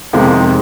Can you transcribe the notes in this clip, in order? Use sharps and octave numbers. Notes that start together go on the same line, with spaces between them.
F2 C3 D#3 G#3